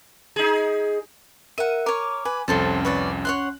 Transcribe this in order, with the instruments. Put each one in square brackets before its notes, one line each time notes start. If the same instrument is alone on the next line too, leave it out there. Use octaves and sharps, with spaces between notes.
[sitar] D#4 G#4
[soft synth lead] A#4 [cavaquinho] E5 F#5 [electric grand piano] D#7
[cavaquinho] A#4 C#5 [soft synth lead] D6
[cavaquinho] B4 [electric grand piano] G#5
[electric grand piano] C2 F2 [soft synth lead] C#4 [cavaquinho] A4 C5 A5
[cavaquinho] B4 C#5 D5
[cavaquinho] C#5 F#5 C6 [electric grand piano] F#6